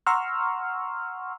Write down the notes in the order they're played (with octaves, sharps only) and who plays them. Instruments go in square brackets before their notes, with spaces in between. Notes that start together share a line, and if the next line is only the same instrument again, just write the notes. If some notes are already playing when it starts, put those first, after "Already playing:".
[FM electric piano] F#5 A#5 C6 C#6 E6 F6